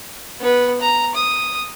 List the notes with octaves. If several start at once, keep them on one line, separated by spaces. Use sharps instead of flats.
B3 B4
A#5
D#6